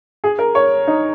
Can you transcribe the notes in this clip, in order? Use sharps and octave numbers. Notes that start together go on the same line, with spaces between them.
G#4
A#4
C#5
D#4